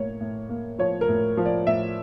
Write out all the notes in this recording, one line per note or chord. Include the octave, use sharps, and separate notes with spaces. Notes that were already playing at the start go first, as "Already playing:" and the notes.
Already playing: A2 A#3 C#5
A2
A#3
F3 C#5
A#4
A2
F3
D5
A2 E5